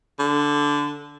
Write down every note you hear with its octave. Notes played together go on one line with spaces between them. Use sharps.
D3